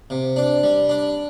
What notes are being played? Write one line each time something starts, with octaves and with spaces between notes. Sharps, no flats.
C3
D4
G3
D4